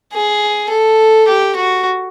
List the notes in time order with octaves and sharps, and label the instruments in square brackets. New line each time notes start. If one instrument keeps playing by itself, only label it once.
[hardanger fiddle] G#4
A4
G4
F#4